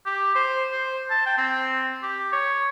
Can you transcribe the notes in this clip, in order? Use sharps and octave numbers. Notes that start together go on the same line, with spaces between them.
G4
C5
C5
A5
G5
C4
G4
C#5